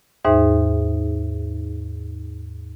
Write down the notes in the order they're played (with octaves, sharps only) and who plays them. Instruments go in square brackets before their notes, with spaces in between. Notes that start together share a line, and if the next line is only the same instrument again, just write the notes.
[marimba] D#2 G#2 D#4 G#4 C5 E5